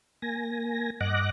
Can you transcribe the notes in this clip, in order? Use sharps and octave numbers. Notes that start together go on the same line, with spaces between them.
A#3 G#5 A#6
G2 D#5 F#5 D6 F#6 A#6